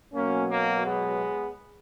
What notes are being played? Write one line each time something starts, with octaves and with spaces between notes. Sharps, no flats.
B2 F#3 A#3 C#4
A#3
G#3 B3